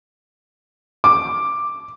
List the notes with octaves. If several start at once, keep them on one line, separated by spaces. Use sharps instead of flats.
D6